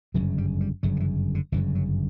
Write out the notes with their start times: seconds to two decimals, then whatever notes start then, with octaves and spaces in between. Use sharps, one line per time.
0.14 G1 F#2 C#3 F#3
0.38 G3
0.61 G3
0.83 G1 F#2 C#3 F#3
0.96 D3
1.00 E3
1.35 D3
1.52 G1 F#2 C#3 E3
1.75 F#3